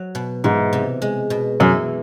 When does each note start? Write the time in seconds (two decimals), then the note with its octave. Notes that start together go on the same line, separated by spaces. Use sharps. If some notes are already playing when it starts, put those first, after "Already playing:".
Already playing: F#3
0.15 B2
0.44 G#2 E3
0.73 C3
1.02 G#3
1.30 B2
1.60 F#2 E3